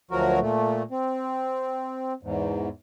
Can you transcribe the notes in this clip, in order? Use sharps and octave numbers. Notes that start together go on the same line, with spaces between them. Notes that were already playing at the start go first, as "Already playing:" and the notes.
D2 F3 F#3 F#4 A#4
A#2 A3
C4
E2 G#2